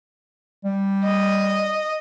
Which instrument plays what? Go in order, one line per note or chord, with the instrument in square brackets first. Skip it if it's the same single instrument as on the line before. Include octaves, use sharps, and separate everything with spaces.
[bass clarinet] G3
[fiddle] D#5